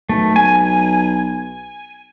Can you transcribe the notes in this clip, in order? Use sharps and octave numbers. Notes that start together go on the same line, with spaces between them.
B1 A3
G#5